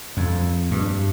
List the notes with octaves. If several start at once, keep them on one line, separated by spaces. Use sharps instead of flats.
F2
G2